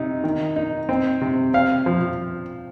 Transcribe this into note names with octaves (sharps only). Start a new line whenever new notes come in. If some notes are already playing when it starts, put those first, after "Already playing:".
Already playing: C3 D#4
D#3
D#4
C4
C3
C4 F5
F3